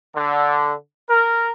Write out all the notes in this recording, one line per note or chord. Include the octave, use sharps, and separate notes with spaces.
D3
A#4